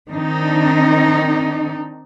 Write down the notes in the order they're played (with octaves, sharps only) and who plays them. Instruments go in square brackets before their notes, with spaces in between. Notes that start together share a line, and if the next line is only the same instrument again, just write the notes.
[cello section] D#3 C4 D4 D#4